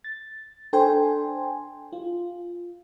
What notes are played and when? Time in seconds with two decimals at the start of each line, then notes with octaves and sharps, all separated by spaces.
0.04 A6
0.73 D4 A4 C5 G5 G#5 C6
1.92 F4